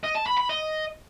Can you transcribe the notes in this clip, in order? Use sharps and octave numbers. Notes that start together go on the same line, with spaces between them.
D#5
A5
B5
B5
D#5